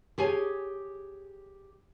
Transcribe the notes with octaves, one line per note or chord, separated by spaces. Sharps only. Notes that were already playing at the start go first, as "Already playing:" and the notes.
G4 G#4 C#5 G#5